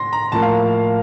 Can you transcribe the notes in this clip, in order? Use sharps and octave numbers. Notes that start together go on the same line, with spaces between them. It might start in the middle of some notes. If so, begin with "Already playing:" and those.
Already playing: A2 C6 A#6
A#5
A2 F3 A#3 A5
F5